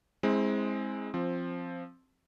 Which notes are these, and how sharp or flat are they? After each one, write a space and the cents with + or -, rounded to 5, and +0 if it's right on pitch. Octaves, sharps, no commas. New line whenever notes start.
G#3 +0 C4 +10 E4 -35
F3 -5 C4 +10